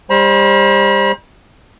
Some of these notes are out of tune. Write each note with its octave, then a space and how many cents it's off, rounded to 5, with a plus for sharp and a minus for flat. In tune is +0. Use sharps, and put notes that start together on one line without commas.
G3 +30 C5 +25 B5 -45